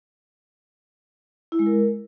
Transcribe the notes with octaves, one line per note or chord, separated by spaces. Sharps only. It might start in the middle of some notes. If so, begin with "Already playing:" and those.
E4
G#3
A#4